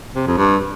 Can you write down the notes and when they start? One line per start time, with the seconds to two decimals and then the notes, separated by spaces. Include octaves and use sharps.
0.16 C3
0.26 F2
0.37 G2